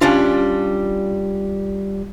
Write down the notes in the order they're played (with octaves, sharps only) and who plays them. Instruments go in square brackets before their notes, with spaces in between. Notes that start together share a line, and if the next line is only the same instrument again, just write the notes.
[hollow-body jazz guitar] G3 C#4 D4 F4